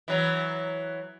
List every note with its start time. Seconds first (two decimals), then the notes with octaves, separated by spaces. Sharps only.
0.08 E3 F#3